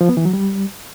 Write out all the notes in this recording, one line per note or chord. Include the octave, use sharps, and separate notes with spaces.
F3
B3
E3
F#3
G3